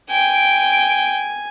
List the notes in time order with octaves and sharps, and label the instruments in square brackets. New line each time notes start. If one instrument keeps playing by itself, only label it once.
[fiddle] G5 [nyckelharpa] G#5 [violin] D7